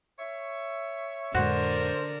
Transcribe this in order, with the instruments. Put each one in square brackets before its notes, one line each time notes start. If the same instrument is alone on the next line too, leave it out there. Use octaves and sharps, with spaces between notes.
[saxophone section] C#5 E5
[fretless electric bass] F2 A2 G#3 [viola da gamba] D3 D4 A#4 [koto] F#4 [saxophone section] C5